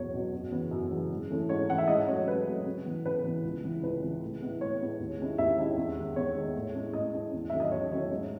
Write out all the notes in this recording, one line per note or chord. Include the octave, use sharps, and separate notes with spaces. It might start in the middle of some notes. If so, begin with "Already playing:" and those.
Already playing: E2 B2 F#3 B3 C#5
B2 F#3 B3
F#2
C#3 E3 B3
F#2
C#3 E3 B3
G#2
E3 A3 C#4 E4
G#2 C#5
E3 A3 C#4 E4 F#5
E5
G#2 D#5
F#3 A3 C#4 C#5
G#2 B4
F#3 A3 C#4
C#3
E3 B3
C#3 B4
E3 B3
C#2
C#3 E3 B3 E4
C#2 B4
C#3 E3 B3 E4
A2
G#3 B3 E4
A2 C#5
G#3 B3 E4
D#2
D#3 G#3 C#4 E4
D#2 E5
D#3 G#3 C#4 E4
E2
D#3 G#3
E2 C#5
D#3 G#3
A2
G#3 C#4 E4
A2 D#5
G#3 C#4 E4
E2
D#3 F#3 A3 C#4 E5
D#5
E2 C#5
D#3 F#3 A3 C#4 C#5
G#2